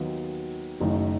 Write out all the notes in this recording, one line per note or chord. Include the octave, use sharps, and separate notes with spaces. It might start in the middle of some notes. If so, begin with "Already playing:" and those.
Already playing: D#2 D#3 F#3 B3 F#4
F#1 F#2 D#3 A3